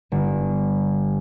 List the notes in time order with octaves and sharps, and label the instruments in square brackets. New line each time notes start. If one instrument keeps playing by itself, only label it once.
[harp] G1